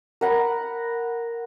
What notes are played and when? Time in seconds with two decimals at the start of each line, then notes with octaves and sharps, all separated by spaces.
0.21 A#4 F#5 B5